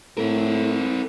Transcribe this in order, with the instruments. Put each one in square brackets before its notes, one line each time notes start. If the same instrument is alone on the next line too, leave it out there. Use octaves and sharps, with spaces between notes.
[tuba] A2 [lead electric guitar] C4 A#4